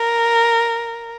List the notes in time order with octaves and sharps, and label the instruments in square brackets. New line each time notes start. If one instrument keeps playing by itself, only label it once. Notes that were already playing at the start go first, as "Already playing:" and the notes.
Already playing: [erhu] A#4